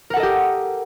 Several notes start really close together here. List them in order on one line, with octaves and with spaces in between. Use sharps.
A#4 F#5 A4 D#5 G4